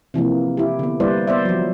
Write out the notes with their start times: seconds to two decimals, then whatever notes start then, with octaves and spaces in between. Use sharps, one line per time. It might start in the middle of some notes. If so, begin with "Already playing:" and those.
0.14 C3 E3 F3 A#3
0.57 E4 G4
0.79 D3 B3
1.00 G3 A#3 E4 B4 C5 D5
1.28 B3 C5 D5 E5
1.45 F3 F#3